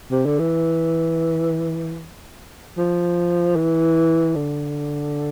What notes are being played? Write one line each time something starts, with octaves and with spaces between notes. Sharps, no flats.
C3
D3
E3
F3
E3
D3